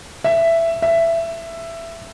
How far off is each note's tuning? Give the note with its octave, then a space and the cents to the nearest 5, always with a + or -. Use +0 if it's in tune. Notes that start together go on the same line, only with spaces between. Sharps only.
E5 +10
E5 +15